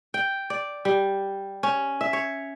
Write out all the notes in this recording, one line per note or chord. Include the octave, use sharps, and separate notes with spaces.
G5
D5
G3
C#4
E5
C#5